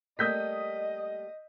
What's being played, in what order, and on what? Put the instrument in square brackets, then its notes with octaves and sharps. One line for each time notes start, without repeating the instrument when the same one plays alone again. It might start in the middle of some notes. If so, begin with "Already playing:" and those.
[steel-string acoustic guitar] G3 A3 A#3 [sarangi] D#5 [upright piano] D#6 G6 B6